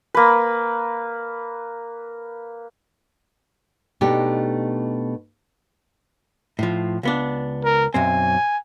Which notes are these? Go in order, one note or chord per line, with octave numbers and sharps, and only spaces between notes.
A#3 B4
B2 A3 D4 D#4 G4
A2 F3
C#2 B3 D4
A#4
B1 F#2 C4 G#5